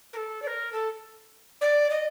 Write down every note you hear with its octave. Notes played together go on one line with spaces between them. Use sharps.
A#4
A4
D5
A#4
A4
D5
D#5